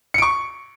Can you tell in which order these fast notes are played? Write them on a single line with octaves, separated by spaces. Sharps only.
C#7 D7 C#6